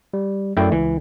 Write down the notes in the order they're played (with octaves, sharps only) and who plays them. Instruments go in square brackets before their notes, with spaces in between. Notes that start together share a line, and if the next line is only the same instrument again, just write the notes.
[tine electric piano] G3
[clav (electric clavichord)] F#2 E4 G5 [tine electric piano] A3 D5
[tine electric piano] C#2 [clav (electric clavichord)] E3